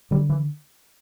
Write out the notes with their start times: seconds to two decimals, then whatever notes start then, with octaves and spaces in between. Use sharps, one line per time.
0.11 D3 G3
0.29 E3